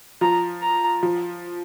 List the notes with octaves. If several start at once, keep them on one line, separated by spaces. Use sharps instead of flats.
F3 A#5
A#5
F3